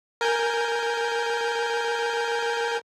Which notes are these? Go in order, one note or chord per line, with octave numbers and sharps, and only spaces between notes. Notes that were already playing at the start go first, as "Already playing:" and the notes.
A#4 G#5 G6